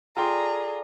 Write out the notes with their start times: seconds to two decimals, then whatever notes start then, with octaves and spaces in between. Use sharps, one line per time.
0.17 F4 G#4 A4 D5 G5 A#5 C6